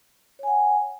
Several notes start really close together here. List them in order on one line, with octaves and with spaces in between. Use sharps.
C#5 G#5 F#5